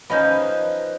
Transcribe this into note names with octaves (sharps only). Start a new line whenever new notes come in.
F3 C#4 D#4 B4 D#5 A5 B5 G6